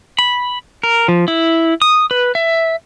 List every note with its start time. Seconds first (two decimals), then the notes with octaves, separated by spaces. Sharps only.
0.19 B5
0.83 A#4
1.08 F3
1.28 E4
1.82 D#6
2.11 B4
2.35 E5